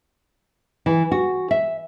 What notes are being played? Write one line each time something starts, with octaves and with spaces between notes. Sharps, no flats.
E3
F#4
E5